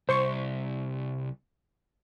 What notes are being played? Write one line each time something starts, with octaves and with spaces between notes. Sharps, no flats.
C2 C5 C6 C#6